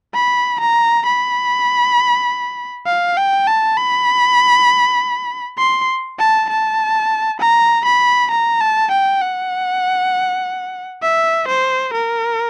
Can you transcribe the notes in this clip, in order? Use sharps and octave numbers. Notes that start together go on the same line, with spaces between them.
B5
A#5
B5
F5
G5
A5
B5
C6
A5
A5
A#5
B5
A#5
A5
G5
F#5
E5
C5
A#4